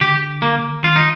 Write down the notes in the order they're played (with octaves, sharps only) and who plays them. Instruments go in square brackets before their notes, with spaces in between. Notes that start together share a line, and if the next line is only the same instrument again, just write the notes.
[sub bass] D3 [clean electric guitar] G4
[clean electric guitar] A#3
[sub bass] D#3 [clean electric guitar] F4
[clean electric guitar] D#4